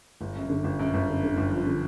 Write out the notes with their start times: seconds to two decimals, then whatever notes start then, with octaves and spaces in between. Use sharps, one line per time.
0.21 G1
0.36 F#2
0.50 D3
0.64 G1
0.79 F#2
0.94 G1
1.09 D3
1.23 D3
1.37 G1
1.52 F3
1.66 D3